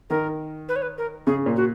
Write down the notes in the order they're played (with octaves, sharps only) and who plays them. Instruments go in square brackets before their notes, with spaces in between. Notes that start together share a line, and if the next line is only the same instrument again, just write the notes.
[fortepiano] D#3 [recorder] A#4
[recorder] B4
C#5
B4
A#4
[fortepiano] C#3 [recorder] G#4
[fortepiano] A#2
[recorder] F#4